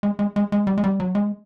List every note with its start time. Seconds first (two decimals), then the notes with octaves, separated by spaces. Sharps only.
0.03 G#3
0.19 G#3
0.36 G#3
0.52 G#3
0.67 G3
0.78 G#3
0.84 G3
1.00 F#3
1.15 G#3